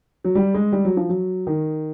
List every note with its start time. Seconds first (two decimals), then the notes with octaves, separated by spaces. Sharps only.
0.24 F#3
0.35 G3
0.54 G#3
0.72 G3
0.85 F#3
0.97 F3
1.09 F#3
1.47 D#3